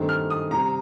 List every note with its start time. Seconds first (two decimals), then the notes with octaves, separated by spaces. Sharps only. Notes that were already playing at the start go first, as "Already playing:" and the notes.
Already playing: G2 D#3 A3 C4
0.09 F6
0.30 D#6
0.51 C3 G3 C4 A#5